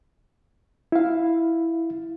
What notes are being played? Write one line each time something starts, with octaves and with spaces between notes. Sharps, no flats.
E4 F5